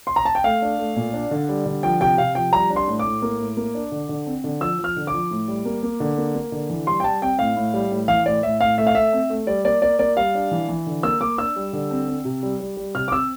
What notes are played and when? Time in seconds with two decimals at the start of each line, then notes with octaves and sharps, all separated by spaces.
0.07 C6
0.16 A#5
0.25 A5
0.35 G5
0.44 A3 F5
0.62 D4
0.79 A3
0.96 A#2
1.13 D4
1.31 D3
1.49 G3
1.66 D3
1.83 F3 G5
2.01 C3 G5
2.18 C3 F5
2.35 F3 G5
2.53 G3 A#5
2.70 D4
2.76 C6
2.88 A2
2.99 D6
3.05 A2
3.22 A#3
3.39 A2
3.57 A#3
3.75 D4
3.92 D3
4.09 D3
4.26 C4
4.44 D3
4.61 F3 E6
4.79 F3
4.84 F6
4.96 D3
5.07 D6
5.13 F3
5.31 A2
5.48 G3
5.65 A#3
5.83 A#3
6.00 D3
6.18 A#3
6.35 A#3
6.52 D3
6.70 E3
6.87 G3 C6
7.00 G5
7.04 G3 A5
7.22 C4 G5
7.39 A2 F5
7.56 A2
7.74 G3
7.91 A2
8.08 E3 F5
8.26 A2 D5
8.43 A2 E5
8.60 A2 F5
8.78 A3 E5
8.87 F5
8.95 A3 E5
9.13 C4
9.30 A3
9.47 G3 D5
9.65 A#3 D5
9.82 A#3 D5
9.99 A#3 D5
10.17 G3 F5
10.35 D4
10.51 E3
10.68 E3
10.86 D3
11.03 A#3 E6
11.21 A#3 D6
11.38 D4 E6
11.56 G3
11.73 D3
11.91 C4
12.08 C4
12.25 C3
12.43 G3
12.60 G3
12.77 G3
12.95 C3 F6
13.08 D6
13.12 C4 E6